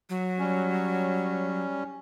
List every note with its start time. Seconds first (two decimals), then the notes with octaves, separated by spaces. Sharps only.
0.10 F#3
0.39 G3 C#4